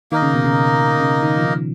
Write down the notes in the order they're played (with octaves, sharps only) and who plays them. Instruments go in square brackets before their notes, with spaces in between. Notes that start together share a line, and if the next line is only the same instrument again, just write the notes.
[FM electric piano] D#3 [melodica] A#3 D#4 A#4 D#5
[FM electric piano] C#3
B2
C#3
C#3
D#3
F3
D#3